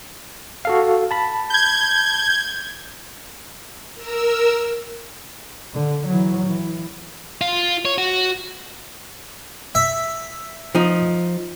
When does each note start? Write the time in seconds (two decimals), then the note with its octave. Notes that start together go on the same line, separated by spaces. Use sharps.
0.65 F#4 A4 F5
1.11 A5 B5
1.50 G6 G#6
3.95 A#4 E6
5.74 D3
6.07 E3 F#3
6.45 E3
7.41 F4
7.85 C#5
7.98 F#4
9.75 E5
10.75 F3 D#4